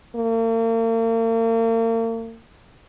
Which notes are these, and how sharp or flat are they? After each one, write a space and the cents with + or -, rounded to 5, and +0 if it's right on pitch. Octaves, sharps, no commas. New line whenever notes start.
A#3 -40